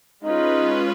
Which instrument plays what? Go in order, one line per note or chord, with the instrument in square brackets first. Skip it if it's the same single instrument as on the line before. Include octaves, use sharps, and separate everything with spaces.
[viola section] G#3 C#4 F4 B4 [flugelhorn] D#4